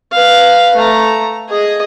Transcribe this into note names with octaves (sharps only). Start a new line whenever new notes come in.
B4 F5
A3 A#5
G#4 D#5